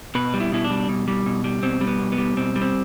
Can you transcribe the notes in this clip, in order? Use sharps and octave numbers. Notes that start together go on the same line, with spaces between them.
B2 B4
G3
E4
B2 E4
D4
G3
B2
G3
B2
G3
B2 C4
G3
B3
B2
B3
G3
B2 C4
G3
C4